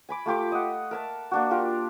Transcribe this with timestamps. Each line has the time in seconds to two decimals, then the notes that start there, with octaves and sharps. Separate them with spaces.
0.09 G#5 B5 D6
0.26 A3 F4 G4 D6
0.52 D#5 F#5
0.91 A#4 E5 A5
1.31 A#3 D4 F#4
1.51 F4 G4 A#4